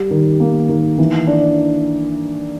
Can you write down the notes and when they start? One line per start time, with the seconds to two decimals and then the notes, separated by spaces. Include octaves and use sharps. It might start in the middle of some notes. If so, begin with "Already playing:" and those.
Already playing: G3
0.11 D#3
0.40 A#3
0.69 D#3
0.98 E3
1.27 D4